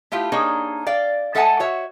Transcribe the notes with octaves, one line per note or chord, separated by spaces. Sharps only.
A3 E4 F4 G4
A#3 D4 D#4 G#4 C#5
D5 F5 G5
G#3 A4 E5 F#5 G#5 A5
F#4 C#5 E5